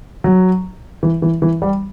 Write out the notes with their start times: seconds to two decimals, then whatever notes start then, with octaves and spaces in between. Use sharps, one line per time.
0.24 F#3
1.03 E3
1.22 E3
1.42 E3
1.62 G3